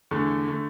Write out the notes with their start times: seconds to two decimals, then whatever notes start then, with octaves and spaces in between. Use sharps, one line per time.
0.11 E2 D3 A3
0.48 D3 A3